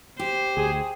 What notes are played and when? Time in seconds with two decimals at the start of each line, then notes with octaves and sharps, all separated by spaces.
0.19 G4 C5
0.57 D2 G#4